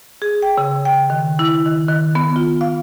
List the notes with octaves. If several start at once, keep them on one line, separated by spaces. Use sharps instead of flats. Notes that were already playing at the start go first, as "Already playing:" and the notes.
G#4
G5
C#3
G5
D#3
E4
D#3
D#3
B3
F4
F5